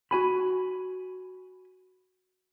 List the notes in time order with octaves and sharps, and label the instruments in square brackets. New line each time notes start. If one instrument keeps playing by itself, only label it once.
[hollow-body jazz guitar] F#4 G#5 B5